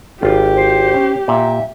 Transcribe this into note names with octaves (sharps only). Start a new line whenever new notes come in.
G#1 F4 G4
C5
C#4
A#2 E5